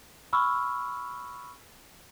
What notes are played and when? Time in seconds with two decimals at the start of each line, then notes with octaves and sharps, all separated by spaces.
0.33 B5 C#6 E6 F6